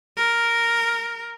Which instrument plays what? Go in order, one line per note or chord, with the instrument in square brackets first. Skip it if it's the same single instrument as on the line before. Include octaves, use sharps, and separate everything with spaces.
[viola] A#4